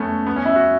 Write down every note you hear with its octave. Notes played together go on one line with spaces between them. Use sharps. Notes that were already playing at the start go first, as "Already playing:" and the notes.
Already playing: A3 B3 C#4
B3
C#4
E4
F#4